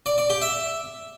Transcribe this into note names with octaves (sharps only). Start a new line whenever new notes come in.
D5
D5
G4
E5